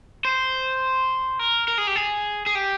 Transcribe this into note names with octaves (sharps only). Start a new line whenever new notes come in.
C5
A#4
A#4
G#4
G4
G#4
G#4
G4